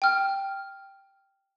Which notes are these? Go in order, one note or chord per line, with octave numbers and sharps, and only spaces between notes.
G5 F6